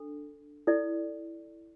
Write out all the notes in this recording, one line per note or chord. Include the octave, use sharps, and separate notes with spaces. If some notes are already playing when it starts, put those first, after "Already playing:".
Already playing: D4 A4
E4 A4 D5